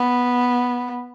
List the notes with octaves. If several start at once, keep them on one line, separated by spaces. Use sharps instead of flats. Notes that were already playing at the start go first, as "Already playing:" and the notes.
Already playing: B3